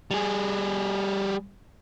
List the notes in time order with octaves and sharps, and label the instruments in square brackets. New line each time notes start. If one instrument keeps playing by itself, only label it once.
[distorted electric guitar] G3 G#4